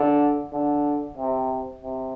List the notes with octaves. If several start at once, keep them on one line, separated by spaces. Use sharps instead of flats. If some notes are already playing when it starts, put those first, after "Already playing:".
Already playing: D3
D3
C3
C3